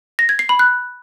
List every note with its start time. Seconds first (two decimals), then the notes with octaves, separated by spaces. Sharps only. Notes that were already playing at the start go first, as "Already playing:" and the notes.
0.19 A#6
0.29 G#6
0.39 C7
0.49 B5
0.59 F#6